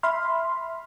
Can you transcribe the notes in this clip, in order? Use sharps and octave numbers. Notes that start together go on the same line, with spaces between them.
E5 B5 C6 F6